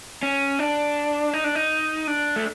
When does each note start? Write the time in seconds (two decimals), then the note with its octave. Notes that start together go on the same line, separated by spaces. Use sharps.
0.23 C#4
0.59 D4
1.33 D#4
1.44 D4
1.55 D#4
2.07 D4
2.36 A3